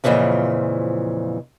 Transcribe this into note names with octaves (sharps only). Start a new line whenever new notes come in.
F2 A#2 C#3 E3 F3